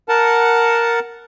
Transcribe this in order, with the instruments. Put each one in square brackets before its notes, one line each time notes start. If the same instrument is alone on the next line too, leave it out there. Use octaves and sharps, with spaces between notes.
[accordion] A#4 F#5 A5